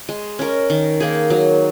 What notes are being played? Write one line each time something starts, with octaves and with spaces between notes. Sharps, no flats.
G#3
C#4 A#4
D#3
A#3 D#4 G#4
F#3